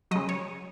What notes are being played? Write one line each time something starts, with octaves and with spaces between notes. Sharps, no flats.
C#3 F#3 D#5
C#5